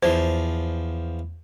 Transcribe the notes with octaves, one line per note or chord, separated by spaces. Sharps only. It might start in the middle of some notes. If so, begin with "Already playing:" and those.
E2 F3 C5